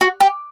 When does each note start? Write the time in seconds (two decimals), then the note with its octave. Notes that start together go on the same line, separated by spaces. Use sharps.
0.01 F#4
0.20 G4